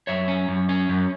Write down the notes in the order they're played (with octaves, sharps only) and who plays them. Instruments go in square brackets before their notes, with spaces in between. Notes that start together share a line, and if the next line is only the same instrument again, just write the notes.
[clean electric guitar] F#2 C#5 E5
C#4
F#2
C#4
F#2